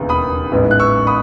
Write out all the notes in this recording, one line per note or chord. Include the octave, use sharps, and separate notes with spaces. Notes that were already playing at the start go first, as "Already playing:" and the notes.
Already playing: E1 D#2 C#3 E3 B3
B5 D#6
A1 G#2 E3 B3
F#6
C#6 E6
B5 D#6